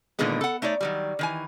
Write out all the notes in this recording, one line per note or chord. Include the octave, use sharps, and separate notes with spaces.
A#2 D3 D#3 G#3 B3
A4 F#5
A3 D#4 C#5 D5
D#3 F#3 G3
D#3 E3 G#5